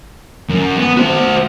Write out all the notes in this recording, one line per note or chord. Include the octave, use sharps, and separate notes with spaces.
F#2
B3
F#4 C5